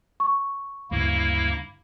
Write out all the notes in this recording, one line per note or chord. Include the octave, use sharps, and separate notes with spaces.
C#6
D2 G2 C#3 A#3 E4